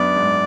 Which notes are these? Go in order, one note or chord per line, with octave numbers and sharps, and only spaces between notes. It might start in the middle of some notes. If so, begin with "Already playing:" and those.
Already playing: F#2 B3 D4 D5
G#2